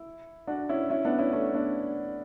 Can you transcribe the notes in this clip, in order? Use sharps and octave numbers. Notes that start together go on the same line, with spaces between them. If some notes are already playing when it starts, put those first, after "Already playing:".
Already playing: E4
D4 F#4
C#4 E4
C#4 E4
B3 D4
C#4 E4
A3 C#4
B3 D4